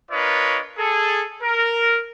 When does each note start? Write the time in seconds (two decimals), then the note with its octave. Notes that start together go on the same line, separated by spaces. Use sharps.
0.11 D4 F4 A#4 B4 C#5 D#5
0.79 G#4 A4
1.43 A#4